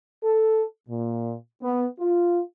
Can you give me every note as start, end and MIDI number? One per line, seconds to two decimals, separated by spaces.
0.23 0.63 69
0.89 1.34 46
1.62 1.85 59
1.99 2.40 65